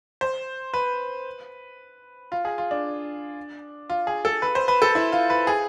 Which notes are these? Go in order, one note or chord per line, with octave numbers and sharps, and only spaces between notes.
C5
B4
F4
G#4
F4
D4
F4
G#4
A4
B4
C5
B4
A4
E4
F4
B4
G#4